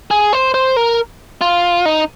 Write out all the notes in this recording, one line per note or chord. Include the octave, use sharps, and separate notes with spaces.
G#4
C5
C5
A#4
F4
D#4